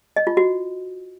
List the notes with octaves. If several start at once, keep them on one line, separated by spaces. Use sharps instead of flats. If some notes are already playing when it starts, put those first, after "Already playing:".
D#5
F4
F#4